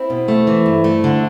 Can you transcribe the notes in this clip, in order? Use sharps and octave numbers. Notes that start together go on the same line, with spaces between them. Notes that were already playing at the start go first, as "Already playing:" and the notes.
Already playing: C4 E4
B2
A3
E3
G2
A3
D3